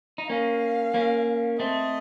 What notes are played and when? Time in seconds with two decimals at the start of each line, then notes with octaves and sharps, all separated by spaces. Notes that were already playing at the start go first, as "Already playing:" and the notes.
0.18 D#4
0.29 A#3 C#4 F5
0.94 A#3 C#4
1.60 A3 C4 D#5